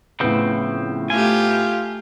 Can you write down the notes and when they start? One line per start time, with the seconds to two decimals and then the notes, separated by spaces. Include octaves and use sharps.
0.20 A2 C#3 F3 B3 C4
1.10 A3 F4 G4 G#5